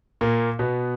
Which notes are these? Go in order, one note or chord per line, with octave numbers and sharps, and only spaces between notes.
A#2 A#3
B2 B3